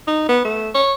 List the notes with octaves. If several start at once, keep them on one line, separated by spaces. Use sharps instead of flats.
D#4
B3
A3
C#5